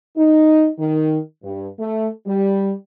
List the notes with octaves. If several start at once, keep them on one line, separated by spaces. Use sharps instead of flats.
D#4
D#3
G2
A3
G3